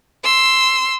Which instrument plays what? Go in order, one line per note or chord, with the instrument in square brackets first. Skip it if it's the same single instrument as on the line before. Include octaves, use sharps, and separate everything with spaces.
[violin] C6 E6